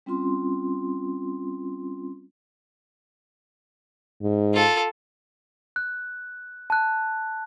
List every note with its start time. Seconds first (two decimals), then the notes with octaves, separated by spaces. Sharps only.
0.06 G3 C4 C#4 F4 C6
4.22 G#2
4.53 F4 A4
5.76 F#6
6.70 A5 F#6